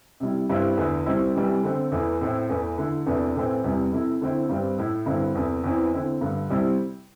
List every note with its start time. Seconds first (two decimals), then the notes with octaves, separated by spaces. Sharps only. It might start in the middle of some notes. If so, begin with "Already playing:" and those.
0.20 C3 G3 E4
0.49 G2 G3 C4 E4
0.77 E2 D3 A3 E4
1.06 C3 G3 C4 E4
1.35 C3 E3 G3
1.63 D3 A3 C4
1.92 E2 E3 A3
2.21 A2 A3 C4 E4
2.49 E2 E3 A3
2.78 D3 A3 E4
3.06 E2 C3 E3 A3 D4
3.35 A2 E3 A3 C4 E4
3.64 E2 C3 G3 E4
3.92 C3 A3 E4
4.21 D3 A3 C4 E4
4.49 G2 G3 C4
4.78 A2 A3 E4
5.06 G2 D3 C4 E4
5.35 E2 C3 A3 E4
5.64 E2 E3 C4 E4
5.93 D3 C4 E4
6.21 G2 D3 A3
6.50 C3 G3 C4 E4